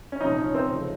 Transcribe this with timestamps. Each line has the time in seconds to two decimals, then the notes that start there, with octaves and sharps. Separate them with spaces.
0.12 C#4
0.20 C2 A#2 F3 D#4
0.38 C#4
0.54 C4
0.71 F1 C#3 F3